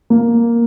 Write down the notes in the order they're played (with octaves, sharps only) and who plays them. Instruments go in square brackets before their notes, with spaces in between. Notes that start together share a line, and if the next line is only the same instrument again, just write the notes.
[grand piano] A#3